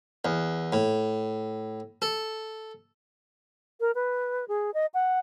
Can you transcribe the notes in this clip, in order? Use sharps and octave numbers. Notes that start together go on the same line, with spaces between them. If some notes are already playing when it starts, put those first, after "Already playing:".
E2
A2
A4
A#4
B4
G#4
D#5
F#5